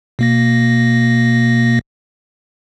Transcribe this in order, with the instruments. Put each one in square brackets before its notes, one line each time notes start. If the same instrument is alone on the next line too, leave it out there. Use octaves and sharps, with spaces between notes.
[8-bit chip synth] B2 A#3 A#6